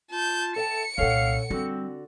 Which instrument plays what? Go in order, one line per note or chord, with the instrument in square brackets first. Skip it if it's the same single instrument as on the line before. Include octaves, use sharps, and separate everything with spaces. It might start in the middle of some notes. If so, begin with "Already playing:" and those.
[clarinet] F4 [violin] A5 G6
[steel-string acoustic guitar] A4 E5 G5 [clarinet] A5 [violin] C#7
[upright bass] C2 A#2 [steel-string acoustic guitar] C#4 A4 F#5 [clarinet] F5
[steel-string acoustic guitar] D3 F#4 [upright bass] G3 [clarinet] C4